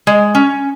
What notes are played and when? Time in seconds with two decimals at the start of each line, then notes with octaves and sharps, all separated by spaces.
0.07 G#3
0.35 C#4